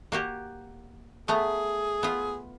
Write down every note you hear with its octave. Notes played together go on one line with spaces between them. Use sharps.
A#3 F#4 G4
A3 B3 G#4 A#5
B3 F4